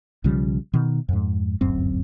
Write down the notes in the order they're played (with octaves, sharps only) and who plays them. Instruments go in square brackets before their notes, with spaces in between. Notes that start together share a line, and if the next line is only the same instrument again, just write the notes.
[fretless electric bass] B1 C#3 F3 G3
B2 D#3
F2 G#2
D1 G1 F#2 C4